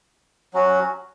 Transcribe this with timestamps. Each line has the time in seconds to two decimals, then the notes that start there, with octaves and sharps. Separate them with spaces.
0.53 F#3 C#4 F#4